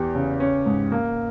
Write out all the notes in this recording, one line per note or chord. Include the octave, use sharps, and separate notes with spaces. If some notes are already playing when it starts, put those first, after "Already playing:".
Already playing: E2 G4
C#3
C#4
G#2
A#3